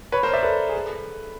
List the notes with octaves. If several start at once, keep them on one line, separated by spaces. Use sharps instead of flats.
B4 C#5
A#4 C5
D5 E5
A4 B4
G#4
A4